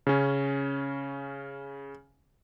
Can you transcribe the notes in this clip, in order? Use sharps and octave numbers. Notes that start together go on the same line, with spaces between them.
C#3 C#4